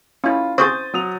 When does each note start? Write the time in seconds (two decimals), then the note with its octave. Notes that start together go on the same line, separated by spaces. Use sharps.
0.24 C#4 E4 F4
0.58 C4 F#4 G#4 C5 D#6 G6 A6
0.94 F#3 D#6 F7